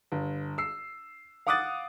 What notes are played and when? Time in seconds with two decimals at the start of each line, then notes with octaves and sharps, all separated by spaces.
0.12 G1
0.58 E6 C7
1.47 F5 F#5 D6 D#6 F#6 A6